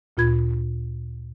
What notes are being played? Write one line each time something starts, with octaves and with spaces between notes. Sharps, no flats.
D2 A#2 F4 B5 G#6